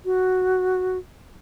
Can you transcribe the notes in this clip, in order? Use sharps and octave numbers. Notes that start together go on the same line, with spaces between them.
F#4